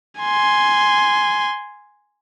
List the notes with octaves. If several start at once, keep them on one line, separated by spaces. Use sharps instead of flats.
G#5 C6